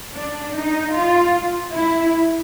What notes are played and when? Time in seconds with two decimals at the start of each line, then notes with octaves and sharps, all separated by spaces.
0.14 D4
0.55 D#4
0.94 F4
1.73 E4